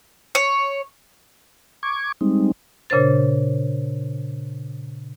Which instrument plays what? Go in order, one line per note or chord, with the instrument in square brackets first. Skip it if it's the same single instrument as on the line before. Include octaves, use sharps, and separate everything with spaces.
[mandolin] C#5
[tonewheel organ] C#6 D6 G#6
G3 G#3 C4 D#4
[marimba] A#2 C#3 D4 C5 A6